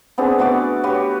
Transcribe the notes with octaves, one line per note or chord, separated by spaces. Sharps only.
B3 C4 D4 G#4
A3 B3 F#4 D5
F#4 G4 B4 C#5